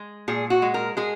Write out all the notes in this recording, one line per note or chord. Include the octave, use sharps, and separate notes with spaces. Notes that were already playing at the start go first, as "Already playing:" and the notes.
Already playing: G#3
A#2 G#4
F#4
G#3
A#4
G#3 G#4